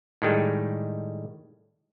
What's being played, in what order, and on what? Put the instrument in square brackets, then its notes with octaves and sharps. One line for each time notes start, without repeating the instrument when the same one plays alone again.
[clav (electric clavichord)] A2 D#3 G3 G#3